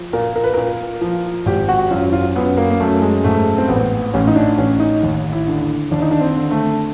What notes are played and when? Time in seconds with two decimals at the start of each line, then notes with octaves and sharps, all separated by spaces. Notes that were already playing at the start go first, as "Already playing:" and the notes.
Already playing: F3
0.13 A#2 A#4
0.36 A#4
0.44 B4
0.54 A#2 A#4
1.01 F3
1.46 G#1 G4
1.69 F#4
1.91 F#2 F4
2.13 F4
2.36 F#2 B3
2.58 A#3
2.71 A#3
2.80 F#2 A3
3.02 G#3
3.24 G#2 A3
3.58 C4
3.68 A1 B3
4.14 A1 C#4
4.27 D#4
4.36 D4
4.58 A1 C#4
4.80 D#4
5.03 D#2
5.33 E4
5.48 D3
5.91 D#2 D4
6.02 D#4
6.11 D4
6.21 C4
6.36 D3
6.51 A3